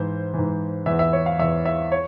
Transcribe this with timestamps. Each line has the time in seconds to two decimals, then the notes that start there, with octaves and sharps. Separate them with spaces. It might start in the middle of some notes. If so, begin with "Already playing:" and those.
Already playing: G#2 E3 C5
0.34 G#2 E3
0.86 E2 E3 E5
0.99 E5
1.13 C#5
1.26 F5
1.39 E2 E3 E5
1.65 E5
1.92 C#5